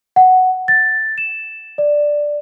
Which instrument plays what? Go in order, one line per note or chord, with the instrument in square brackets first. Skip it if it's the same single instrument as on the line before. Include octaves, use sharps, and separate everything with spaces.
[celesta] F#5
A6
E7
D5